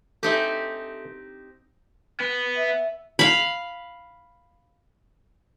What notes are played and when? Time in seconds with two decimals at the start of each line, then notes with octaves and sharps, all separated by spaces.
0.23 C4 D#4 G4 A4 E5 G#5
2.20 B3
2.57 E5
3.19 F5 B5